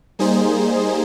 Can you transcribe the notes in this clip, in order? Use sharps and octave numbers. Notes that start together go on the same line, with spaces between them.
G3 A#3 D#4 G#4 C5